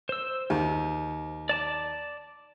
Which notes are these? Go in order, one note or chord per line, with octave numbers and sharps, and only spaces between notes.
C5 E6
D#2
D5 A5 D6